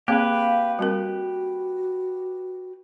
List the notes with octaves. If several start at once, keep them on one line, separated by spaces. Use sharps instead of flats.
A#3 C4 G4 G#4 B4 F5
G3 C4 F#4 A#4